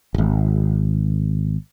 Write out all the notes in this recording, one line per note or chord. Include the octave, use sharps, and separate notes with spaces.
D#1 G#1